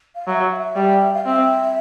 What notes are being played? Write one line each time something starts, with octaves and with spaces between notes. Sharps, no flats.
F5
F#3 E5 F5
F5
E5
G3
F5
C4 E5